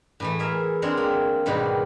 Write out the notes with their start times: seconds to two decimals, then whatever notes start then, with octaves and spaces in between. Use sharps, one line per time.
0.20 A2 E3 A3
0.39 G#4 A#4 E5
0.82 G#3 C4 D4 A#4 C#5
0.97 A#3
1.46 G#2 B2 D#3 G3 F#4